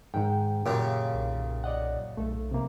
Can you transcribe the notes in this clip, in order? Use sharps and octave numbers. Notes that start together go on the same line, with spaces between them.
G#2 D#3 G5
F#2 A#2 C#3 G4 F5
B1
D5 D#5 F#5
B1 A3 A4
C3 A#3